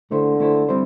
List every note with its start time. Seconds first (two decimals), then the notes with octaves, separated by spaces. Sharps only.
0.11 D3 A3 E4 C5
0.40 A3 E4 C5
0.69 G3 C4 E4 C5